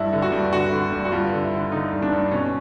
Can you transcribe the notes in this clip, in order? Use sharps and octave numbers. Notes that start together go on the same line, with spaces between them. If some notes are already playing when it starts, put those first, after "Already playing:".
Already playing: G2 E4
D3
F#4
G2
D3 F#4
D3
G2
F#4
G2 F4
D3
E4
D3
D3 D#4
G2
D4
G2
B2 C#4